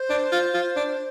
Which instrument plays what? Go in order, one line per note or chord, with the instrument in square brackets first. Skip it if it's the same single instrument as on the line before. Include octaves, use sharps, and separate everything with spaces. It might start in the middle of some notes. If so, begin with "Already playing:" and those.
Already playing: [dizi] C5
[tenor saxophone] D4
F4
F4
D4